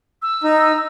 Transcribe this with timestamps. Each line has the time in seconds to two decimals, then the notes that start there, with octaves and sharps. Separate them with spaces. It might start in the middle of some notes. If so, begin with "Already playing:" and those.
0.22 E6
0.43 D#4